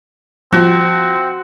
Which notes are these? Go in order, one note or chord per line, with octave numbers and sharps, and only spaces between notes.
F3 C4 F#4